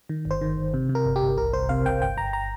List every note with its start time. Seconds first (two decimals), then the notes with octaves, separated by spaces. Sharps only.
0.09 D#3
0.25 G1
0.31 C5
0.41 D#3
0.57 G1
0.74 C3
0.89 C3
0.95 A#4
1.05 G1
1.16 G4
1.22 G1
1.38 C2 A#4
1.53 C2 C5
1.69 C3 F5
1.86 C2 G5
2.02 G1 G5
2.17 G1 A#5
2.33 A#5